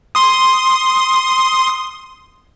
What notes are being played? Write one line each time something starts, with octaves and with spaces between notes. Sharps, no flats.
C6 D#6